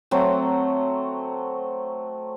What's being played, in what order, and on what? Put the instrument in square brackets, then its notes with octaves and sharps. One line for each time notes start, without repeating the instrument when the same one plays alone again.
[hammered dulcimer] F#3 A3 C4